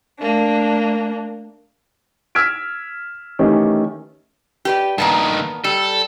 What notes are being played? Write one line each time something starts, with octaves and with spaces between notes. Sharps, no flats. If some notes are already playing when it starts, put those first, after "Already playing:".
A3 A#3 D4
E6 F6 G#6 B6 D7
D#3 E3 A3 C#4 G4
G4 B4 D5
G2 D#3 A#3 B3 A5
G3 A4